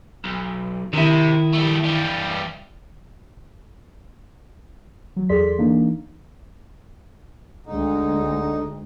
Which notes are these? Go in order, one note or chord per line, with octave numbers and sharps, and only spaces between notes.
B1
C3 D#3 E4
G3 A3
E3 G3
F#3
E2 G#4 A4 D5 C6 B6
E3 A#3 D4 D#4
D2 D3 G#3 D#4